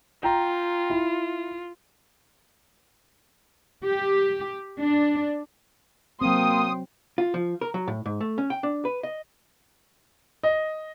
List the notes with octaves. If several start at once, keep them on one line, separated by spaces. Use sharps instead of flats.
F4 G5 A#5
E4
G4
D4
F#3 A#3 C4 G5 C6 D#6
F4
F3
A#4
F#3
A2
G#2
A3
C#4
G5
D4
B4
D#5
D#5